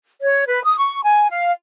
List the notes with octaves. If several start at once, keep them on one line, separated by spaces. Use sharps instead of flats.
C#5
B4
D#6
C#6
G#5
F5